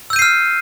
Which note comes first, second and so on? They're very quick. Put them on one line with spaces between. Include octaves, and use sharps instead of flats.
E6 G6 D#7 C7 F6